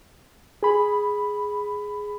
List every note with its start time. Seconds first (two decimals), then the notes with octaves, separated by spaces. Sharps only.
0.63 G#4 B5